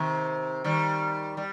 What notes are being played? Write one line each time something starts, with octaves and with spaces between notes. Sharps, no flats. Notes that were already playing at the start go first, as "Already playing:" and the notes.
Already playing: C3 D#3
D#3 G3
G3